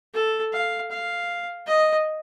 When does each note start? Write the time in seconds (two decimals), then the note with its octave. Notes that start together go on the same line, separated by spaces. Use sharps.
0.14 A4
0.53 F5
0.91 F5
1.67 D#5